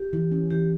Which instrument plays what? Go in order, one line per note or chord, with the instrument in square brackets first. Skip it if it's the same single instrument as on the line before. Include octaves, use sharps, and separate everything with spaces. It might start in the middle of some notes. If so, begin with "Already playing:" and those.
Already playing: [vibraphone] G4
[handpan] E3
C#4
[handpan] E3 [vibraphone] G4